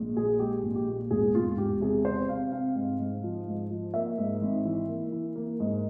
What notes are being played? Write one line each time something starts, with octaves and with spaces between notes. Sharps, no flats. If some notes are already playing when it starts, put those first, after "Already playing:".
Already playing: A#1 G#3
A#2 G#4
G#3 G4
A#1
G4
A#2
E1 G#4
E1 F4
E1 G4
C3 G#4
C3 C5
C3 F5
C4 F5
G#2
G#2
F3
G#2
F3
A#3 E5
G#2
G#1
E3
A#3
E3
A#3
G#2